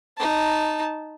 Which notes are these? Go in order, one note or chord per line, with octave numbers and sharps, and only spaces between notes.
D#4 A5